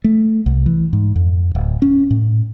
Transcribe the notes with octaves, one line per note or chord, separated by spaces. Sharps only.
A3
C2
E3
G#2
F2
D1
C#4
A2